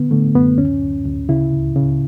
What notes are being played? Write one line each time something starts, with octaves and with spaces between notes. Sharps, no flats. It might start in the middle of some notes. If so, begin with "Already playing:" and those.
Already playing: D3 B3
D3 A3
F#2 B3
D2 C#4
D2
D2
C#3 E4
C#2
C#3